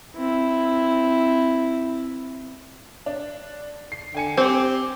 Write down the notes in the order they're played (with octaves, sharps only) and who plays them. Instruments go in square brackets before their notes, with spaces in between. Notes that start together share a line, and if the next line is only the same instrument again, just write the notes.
[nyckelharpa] C4 E4
[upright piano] D4
C7
[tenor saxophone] D3 [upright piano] G5 G#5 C#7
[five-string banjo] C4 [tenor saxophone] G4